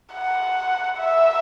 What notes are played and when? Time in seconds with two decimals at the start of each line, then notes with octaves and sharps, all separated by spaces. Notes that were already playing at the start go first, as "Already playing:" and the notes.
0.13 F#5
0.98 E5